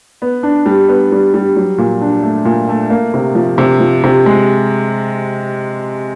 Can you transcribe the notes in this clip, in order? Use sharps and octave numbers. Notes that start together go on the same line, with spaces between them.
B3
D4
G3
B3
G3
G3
F#3
A#2
D4
A3
A#2
A3
A#3
C3
F3
C3
F3
C3
G#3